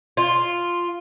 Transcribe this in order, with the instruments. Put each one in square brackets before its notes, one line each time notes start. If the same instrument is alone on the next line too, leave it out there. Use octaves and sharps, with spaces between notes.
[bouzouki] F4